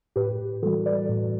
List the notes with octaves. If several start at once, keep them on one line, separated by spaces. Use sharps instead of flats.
A2 G4 B4
E3 G3 F#4 A4
B4 D5
A2